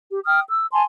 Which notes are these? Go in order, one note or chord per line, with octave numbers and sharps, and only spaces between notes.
G4
G5 D#6 F6
E6
G#5 A5 C6